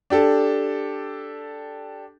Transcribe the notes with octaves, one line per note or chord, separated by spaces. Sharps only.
D4 G4 A4